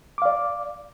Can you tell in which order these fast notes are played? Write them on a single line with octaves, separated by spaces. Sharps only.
D6 F5 D5